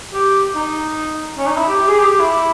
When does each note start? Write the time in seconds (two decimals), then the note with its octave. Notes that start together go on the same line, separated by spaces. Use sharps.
0.13 G4
0.55 D#4
1.37 C#4
1.47 D#4
1.57 E4
1.68 G4
1.78 G4
1.88 G#4
1.99 G4
2.09 G4
2.19 E4